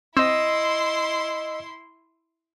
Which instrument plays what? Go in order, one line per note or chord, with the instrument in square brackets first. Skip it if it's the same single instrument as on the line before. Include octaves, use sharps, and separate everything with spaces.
[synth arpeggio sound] C4 [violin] E4 C6 [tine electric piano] D#5 E6